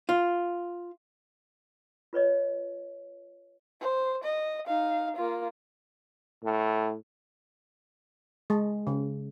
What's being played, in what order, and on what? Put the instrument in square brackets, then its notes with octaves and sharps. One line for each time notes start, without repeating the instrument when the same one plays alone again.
[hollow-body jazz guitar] F4
[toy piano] F4 B4 C#5 D#5
[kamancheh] C5
D#5
D#4 F5
A#3 F4
[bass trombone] A2
[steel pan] G#3
C#3